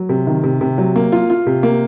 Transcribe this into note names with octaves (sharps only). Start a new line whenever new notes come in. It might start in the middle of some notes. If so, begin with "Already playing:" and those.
Already playing: F#3
C3
D#3
C3
C3
F#3
A#3
F4
F4
C3
A#3